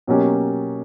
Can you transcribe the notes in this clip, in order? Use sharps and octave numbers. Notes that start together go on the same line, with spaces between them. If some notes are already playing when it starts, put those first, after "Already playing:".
B2 F#3 A#3 C#4 G4